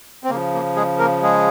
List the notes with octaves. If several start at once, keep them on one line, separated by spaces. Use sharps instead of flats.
C4
C#3 F3 A#3
A#3
G#3 G#4
A#3 A#4
G#3 G#4